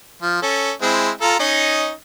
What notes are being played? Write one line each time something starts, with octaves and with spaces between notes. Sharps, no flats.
F3
C#4 A4
G#3 C4 E4
F4 A4 A#5
C#4 D#4 D#5